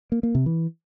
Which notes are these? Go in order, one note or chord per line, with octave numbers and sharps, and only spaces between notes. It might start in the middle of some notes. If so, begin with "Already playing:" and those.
A#3
A#3
C3
E3